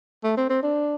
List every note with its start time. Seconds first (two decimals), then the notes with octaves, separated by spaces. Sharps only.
0.24 A3
0.37 C4
0.50 C4
0.63 D4